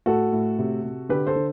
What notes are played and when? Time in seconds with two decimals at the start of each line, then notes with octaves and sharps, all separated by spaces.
0.06 A2 F#4 A4
0.32 A2
0.59 C3
0.84 C3
1.09 D3 G4 B4
1.27 A4 C5
1.36 D3